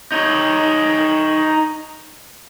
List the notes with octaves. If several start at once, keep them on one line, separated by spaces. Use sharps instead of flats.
D#4 C#5